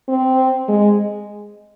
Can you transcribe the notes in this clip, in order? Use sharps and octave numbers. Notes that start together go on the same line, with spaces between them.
C4
G#3